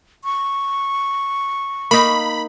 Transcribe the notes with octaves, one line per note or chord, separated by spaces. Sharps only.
C#6
A#3 D#4 B5